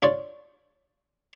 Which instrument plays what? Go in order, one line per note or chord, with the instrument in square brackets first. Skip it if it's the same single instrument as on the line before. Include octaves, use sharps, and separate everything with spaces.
[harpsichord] D4 F4 C#5 D5